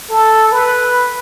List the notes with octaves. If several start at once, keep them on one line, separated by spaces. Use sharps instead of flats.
A4
B4